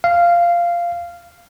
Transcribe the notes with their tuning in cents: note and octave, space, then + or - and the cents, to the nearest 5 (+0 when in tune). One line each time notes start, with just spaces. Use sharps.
F5 -10